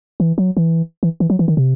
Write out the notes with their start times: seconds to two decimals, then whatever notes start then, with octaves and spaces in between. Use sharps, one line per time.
0.20 E3
0.38 F#3
0.57 E3
1.03 E3
1.20 E3
1.30 F#3
1.39 E3
1.48 D#3
1.57 C3